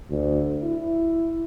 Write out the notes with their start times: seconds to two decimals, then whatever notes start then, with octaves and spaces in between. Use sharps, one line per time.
0.10 D2
0.63 E4